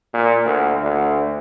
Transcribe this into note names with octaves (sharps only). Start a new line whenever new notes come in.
A#2
D2
D2